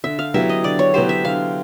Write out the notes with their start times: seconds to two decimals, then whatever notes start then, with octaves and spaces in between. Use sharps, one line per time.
0.04 D3 E5
0.19 F5
0.34 F#3 B3 E4 G4 E5
0.49 D#5
0.64 D3 D5
0.79 C#5
0.94 F#3 B3 E4 G4 C5
1.09 E5
1.24 D3 F5